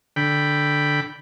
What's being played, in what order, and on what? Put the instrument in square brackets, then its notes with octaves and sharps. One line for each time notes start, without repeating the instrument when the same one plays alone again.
[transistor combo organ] D3 G5 B5